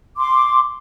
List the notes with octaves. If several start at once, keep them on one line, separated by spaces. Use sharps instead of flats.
C6 D6